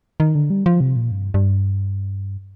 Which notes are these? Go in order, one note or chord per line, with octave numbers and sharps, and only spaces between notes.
D#3
D3
G3
F3
C3
A#2
G2
G2